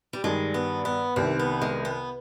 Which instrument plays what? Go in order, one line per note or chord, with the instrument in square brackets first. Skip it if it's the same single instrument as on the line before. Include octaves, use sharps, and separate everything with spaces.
[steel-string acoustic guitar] G3
[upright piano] G2 D#3 G3 D4 G#4 [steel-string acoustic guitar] G#3
[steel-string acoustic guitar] B3
B3
[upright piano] C2 C3 D#3 [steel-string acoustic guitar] C4
[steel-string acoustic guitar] B3
G#3
B3